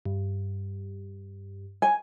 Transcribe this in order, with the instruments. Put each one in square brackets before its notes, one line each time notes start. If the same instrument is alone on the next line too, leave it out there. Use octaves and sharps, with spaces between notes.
[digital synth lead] G2
[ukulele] G#5